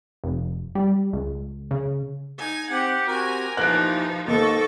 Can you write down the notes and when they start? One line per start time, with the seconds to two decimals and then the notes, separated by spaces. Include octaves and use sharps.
0.24 F1
0.75 G3
1.13 C#2
1.71 C#3
2.38 D#4 G#5
2.70 C4 G4 F#5
3.08 C4 F#4 G4 A#4 G#5
3.57 D#2 E3 F3 D#4 F#6 D7
4.28 D#2 G#2 A4 D#5 C#6 D6